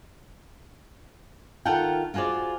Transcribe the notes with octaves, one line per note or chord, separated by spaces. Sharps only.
D#3 F4 A4 A#4 F#5 G5
F4 F#4 G#4 C5 D5